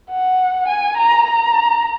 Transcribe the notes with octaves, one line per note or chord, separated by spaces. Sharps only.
F#5
G#5
A#5
A#5